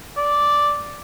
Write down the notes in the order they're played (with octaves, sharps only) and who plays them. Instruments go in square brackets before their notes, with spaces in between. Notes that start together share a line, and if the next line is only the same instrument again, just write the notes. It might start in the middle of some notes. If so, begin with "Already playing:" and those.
[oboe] D5